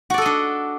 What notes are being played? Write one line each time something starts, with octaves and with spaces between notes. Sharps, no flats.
D4 F#4 A4 D5 D#5